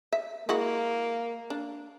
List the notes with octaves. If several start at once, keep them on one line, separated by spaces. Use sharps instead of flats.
E5
G#3 A#3 E4 F#4
D4